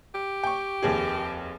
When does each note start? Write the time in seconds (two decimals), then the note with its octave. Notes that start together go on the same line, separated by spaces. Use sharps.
0.15 G4
0.43 G5 C#6
0.83 F1 D#2 G#4